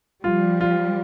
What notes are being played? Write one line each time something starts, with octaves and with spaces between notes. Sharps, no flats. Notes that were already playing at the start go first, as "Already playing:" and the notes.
F3 G3 F4
F4